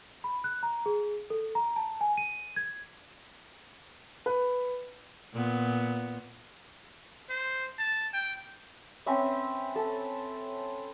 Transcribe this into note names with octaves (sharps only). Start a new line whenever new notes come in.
B5
F#6
A#5
G#4
A4
A#5
A5
G#5
D#7
G#6
B4
A#2 B3
C5
A5
G5
C4 C#4 B4 E5
A4